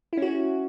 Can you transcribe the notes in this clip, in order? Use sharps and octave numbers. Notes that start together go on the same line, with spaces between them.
C#4 E4 F#4